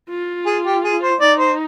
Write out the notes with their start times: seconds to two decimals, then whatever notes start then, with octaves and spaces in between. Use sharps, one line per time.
0.10 F4
0.46 G#4
0.65 G4
0.84 G#4
1.02 C5
1.21 D#4 D5
1.39 C5